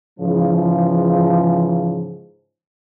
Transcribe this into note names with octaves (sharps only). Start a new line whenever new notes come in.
G#2 C#3 E3 F3